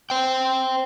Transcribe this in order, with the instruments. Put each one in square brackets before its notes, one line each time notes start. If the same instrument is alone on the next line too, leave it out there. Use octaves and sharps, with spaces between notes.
[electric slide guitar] C5 G5